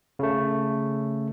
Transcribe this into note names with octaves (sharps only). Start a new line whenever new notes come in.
C#3 A3